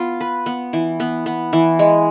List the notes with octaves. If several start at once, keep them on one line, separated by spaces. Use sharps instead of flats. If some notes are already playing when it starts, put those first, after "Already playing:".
Already playing: B3 F4
B4
B3
E3
B3
B3
E3
G#3